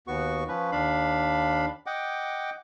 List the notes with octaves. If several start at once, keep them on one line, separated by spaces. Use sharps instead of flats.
D#2 B3 F#4 C#6
F3 C#4 B4
D#2 D4 F5 B5
D#5 F#5 G5 D6